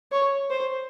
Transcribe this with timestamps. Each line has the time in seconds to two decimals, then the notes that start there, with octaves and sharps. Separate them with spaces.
0.12 C#5
0.50 C5